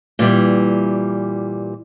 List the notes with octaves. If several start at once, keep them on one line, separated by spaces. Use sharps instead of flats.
A#2 E3 G3